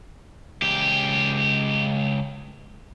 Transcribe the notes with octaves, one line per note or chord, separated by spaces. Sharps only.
C#2 G4